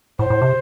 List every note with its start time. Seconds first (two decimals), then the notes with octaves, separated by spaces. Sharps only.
0.19 A2 C5
0.30 A2
0.41 C3